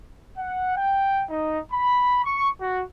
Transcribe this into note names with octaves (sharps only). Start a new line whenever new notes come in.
F#5
G5
D#4
B5
C#6
F#4